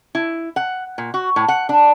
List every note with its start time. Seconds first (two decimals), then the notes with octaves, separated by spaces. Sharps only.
0.15 E4
0.56 F#5
0.98 A#2
1.14 F#4
1.36 A2
1.48 F#5
1.69 D4